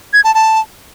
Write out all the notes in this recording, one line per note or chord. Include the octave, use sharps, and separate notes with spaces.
G#6
A5
A5